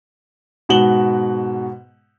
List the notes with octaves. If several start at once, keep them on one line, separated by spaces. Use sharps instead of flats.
G#2 B2 F#4 E7 F#7 G7